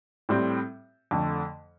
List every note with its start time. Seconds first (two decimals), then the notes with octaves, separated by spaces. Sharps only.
0.29 A2 G3 C4
1.11 F2 D3 A3